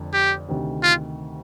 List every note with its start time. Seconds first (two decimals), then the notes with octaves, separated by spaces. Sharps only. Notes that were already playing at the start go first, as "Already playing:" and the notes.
Already playing: F1 F2 D3
0.13 G4
0.48 D2 C3 D#3
0.83 F4